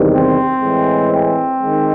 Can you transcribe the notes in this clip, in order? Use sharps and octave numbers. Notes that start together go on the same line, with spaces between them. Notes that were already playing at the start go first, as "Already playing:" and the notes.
Already playing: E2 C3 D#3 G3
C4
A2 E3 G#3
C4
D#3 G#3